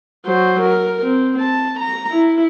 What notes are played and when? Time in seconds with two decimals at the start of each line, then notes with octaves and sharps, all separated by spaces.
0.26 F#3 C5
0.62 A#4
1.03 C4
1.40 A5
1.80 A#5
2.11 E4